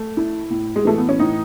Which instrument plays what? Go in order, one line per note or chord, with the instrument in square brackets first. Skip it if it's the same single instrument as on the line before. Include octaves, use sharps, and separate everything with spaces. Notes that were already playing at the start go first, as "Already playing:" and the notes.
Already playing: [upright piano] A3
E4
A2
[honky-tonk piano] G#3
[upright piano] E3 [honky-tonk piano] A3
[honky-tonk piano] B3
C#4
[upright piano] A2 [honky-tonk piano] D#4